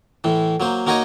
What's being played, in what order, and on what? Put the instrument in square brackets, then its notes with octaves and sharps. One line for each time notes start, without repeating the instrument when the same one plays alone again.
[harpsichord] A2 E3
F#3 A#3 C5
A#3 D#4 F#4 A#4 C#5 D#5